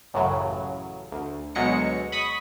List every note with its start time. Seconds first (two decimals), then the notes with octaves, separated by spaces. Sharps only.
0.14 A1 F#2 A2 C#3 F#3
1.12 D2
1.55 D2 B2 F#3 G#3 A#6 C#7
2.12 B5 C#6 D#6 B6